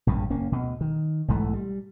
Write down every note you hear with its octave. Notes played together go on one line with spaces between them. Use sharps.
A#1 G2 C#3
F#1 A#3 C#4
D2 B2
D#3
B1 G#2 E3 A3
G3